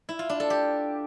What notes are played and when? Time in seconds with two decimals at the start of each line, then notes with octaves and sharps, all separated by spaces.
0.09 E4
0.19 F4
0.29 D4
0.40 A4
0.50 G4